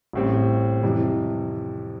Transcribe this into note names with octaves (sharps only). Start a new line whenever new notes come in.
A1 A2 G3 C4
F2 C3 E3 G3